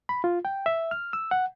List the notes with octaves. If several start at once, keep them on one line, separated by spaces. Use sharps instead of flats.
B5
F4
G5
E5
F6
E6
F#5